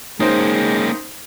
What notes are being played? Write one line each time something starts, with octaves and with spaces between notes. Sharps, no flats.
G#3 A#3 C#4 D#4 C5